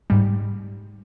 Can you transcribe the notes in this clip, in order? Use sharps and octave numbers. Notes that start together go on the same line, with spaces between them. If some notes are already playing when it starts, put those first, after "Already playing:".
G#2 G3